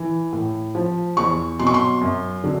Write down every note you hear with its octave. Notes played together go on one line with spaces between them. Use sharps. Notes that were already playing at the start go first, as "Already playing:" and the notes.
Already playing: E3
A2
F3
E2 C#6
B2 F#3 C6
C#6
C6
F#2
D3 F#3